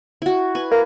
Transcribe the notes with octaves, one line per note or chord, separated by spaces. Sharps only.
E4 F#4
B4 G#5
A#3